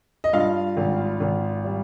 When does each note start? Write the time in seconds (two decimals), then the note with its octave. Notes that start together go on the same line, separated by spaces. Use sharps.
0.24 D#5
0.33 G2 F4 F5
0.77 G#1
1.20 G#1
1.65 G3